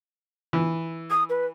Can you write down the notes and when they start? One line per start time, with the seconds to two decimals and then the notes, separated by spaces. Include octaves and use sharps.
0.53 E3
1.10 D#6
1.29 B4